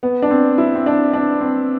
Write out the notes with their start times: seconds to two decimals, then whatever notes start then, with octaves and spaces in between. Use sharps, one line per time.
0.03 B3
0.22 D4
0.30 C4
0.58 E4
0.75 C4
0.86 D4
1.13 D4
1.41 C4